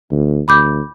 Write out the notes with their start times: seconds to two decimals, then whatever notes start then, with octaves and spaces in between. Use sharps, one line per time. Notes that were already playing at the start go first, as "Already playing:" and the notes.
0.12 D2
0.48 D2 B5 D6 G6